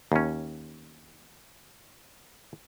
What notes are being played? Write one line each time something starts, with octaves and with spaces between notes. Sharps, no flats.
D#2 C#4